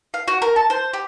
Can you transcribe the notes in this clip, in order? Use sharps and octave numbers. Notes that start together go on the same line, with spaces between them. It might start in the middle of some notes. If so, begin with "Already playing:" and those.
F5
F#4
A#4
A5
C5
G4